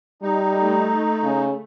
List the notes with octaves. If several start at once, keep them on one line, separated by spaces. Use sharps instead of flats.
G3 D#4
A3
C#3